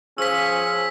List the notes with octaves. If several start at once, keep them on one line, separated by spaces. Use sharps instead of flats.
F3 C#4 G#4 E6 B6